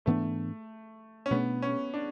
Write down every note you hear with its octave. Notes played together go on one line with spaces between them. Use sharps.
G#2 E3 A3 B3 D4
C#4
B2 A3 B3 D4
C#4
D4